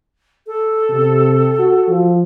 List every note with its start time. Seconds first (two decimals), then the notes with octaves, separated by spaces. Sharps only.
0.47 A4
0.90 C3
1.59 F#4
1.89 F3